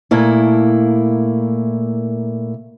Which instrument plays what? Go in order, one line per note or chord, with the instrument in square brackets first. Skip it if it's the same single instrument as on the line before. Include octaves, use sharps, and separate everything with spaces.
[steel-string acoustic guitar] A#2 A3 A#3 E4